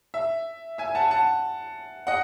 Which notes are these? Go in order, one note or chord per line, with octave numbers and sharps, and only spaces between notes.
E5
E5 G#5
F#5 A5
F#5 A5
D#5 F#5